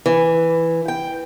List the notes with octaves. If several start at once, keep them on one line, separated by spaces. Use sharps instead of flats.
E3
G5